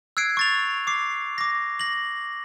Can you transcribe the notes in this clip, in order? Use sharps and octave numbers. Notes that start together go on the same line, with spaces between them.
E6 F#6 G#6 C7 D7
C#6 A6 F7
D6 C7
D6 A#6
A#6 F#7